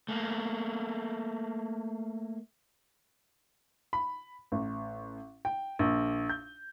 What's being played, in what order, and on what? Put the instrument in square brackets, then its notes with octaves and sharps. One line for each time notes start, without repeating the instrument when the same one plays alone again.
[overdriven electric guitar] A3 A#3
[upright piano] B5
A1
G5
A#1
G6